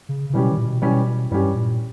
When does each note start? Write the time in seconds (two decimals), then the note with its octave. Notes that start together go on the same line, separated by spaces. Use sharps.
0.09 C#3
0.30 C#3
0.33 B2 E3 G3 C#4 G4
0.50 D#3
0.58 A#2
0.66 B2
0.82 B2 E3 G3 C#4 G4
1.31 G2 E3 G3 C#4 G4
1.55 A#2